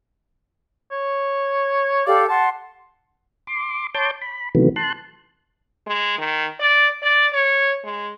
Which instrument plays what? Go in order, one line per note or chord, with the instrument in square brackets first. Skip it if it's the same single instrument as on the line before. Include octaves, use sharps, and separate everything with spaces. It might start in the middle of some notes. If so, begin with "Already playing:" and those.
[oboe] C#5
[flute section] G4 A4 F5 [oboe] D5
[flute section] F#5 C6 [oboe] A5
[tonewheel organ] C6 D6
C#5 A5 C6 D6 G6
B5
C3 D#3 E3 F#3 A3 B3
A5 C6 F#6
[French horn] G#3
D#3
D5
D5
C#5
G#3